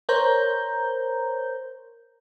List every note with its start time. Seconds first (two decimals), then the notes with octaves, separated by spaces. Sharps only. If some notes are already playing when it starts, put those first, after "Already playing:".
0.09 A#4 C5 C#5 A#5 G6